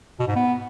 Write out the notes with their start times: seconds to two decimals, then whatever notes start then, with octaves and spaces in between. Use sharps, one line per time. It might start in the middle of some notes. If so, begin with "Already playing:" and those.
0.19 B2
0.28 G#2
0.36 B3